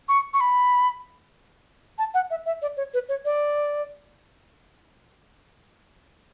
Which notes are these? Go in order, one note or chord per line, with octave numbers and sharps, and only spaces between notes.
C#6
C#6
B5
A5
F#5
E5
E5
D5
C#5
B4
C#5
D5